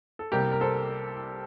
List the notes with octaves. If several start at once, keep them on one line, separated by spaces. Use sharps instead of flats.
A4
C2 C3 G3 A#3 G4 A#4
A#4
A4 C5